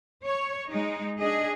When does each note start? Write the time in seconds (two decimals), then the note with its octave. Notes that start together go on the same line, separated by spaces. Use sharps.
0.24 C#5
0.69 G#3 D#4
1.17 D4 G#4 D#5